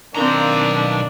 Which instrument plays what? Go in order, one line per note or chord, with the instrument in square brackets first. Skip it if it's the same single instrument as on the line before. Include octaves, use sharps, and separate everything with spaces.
[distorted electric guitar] B1 A#5 [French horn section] D#3 A#3 [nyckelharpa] C4 [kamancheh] D4